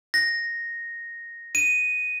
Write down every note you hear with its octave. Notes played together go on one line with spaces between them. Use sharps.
A#6
D#7